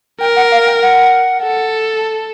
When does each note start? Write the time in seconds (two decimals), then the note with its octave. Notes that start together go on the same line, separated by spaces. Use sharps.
0.20 A#4 G5
0.36 F#5
0.51 F5
0.66 G5
0.82 F#5
1.43 A4